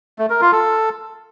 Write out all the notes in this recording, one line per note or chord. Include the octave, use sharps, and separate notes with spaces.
A3
A#4
F4
A4